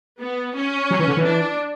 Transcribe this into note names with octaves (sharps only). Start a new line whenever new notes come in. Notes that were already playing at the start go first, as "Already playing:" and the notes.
B3
C#4
F#3
E3
D3
E3
D4